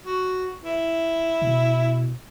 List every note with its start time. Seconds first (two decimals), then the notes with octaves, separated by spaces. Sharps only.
0.05 F#4
0.64 E4
1.42 B2